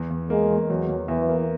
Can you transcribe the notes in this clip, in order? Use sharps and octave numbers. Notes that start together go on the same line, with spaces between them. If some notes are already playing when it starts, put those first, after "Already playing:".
Already playing: E2
E2
G#3 A#3
E2
E2 F#3
E2
E2 E3
A#3